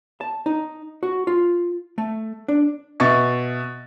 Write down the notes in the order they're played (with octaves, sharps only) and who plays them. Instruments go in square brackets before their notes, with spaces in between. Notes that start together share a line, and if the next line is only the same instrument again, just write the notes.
[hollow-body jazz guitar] A5
D#4
F#4
F4
A3
D4
[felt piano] B2 E5 C#6 A6